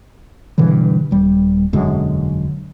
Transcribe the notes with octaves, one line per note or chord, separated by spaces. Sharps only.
G2 B2 D3 E3
D#1 G3
E1 F#2 D3 G#3